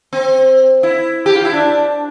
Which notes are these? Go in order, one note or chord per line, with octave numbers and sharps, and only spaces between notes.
C4
E4
G4
F4
E4
D4